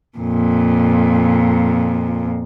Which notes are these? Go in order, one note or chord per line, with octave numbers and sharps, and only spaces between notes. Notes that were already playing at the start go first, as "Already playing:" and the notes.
F2 A#2